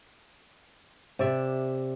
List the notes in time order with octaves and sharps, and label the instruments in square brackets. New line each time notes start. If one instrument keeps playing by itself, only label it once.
[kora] C3 D5 E5